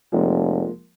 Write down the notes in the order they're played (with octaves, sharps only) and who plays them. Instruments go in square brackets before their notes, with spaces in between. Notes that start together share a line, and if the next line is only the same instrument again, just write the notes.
[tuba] F1 [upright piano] F3 G#3 A#3